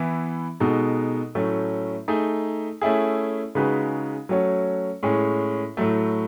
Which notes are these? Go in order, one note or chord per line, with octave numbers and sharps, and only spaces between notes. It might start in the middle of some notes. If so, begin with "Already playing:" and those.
Already playing: E3 B3 E4
B2 G#3 D#4 F#4 A4
A2 F#3 A3 C#4
A3 D#4 G#4
A3 C#4 E4 G#4
C#3 G#3 D#4 F#4 B4
F#3 A3 C#4 F#4 C#5
A2 G#3 C#4 G#4
A2 F#3 A3